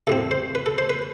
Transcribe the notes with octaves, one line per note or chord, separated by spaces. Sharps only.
A2 G3 C4 A4
C5
B4
A4
C5
B4